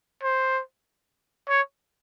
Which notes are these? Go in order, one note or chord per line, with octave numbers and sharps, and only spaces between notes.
C5
C#5